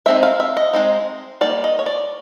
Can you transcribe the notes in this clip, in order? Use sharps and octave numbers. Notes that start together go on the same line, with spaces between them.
G#3 C4 D#4 E5
F5
E5
D#5
G#3 C4 D#4
G3 A#3 D#4 D5
D#5
C#5
D5